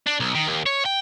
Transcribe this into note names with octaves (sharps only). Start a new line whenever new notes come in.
D4
B1
D#3
D#2
C#5
G5